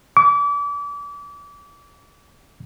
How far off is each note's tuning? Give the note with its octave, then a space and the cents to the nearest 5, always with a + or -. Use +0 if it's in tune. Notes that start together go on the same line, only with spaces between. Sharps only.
D6 -35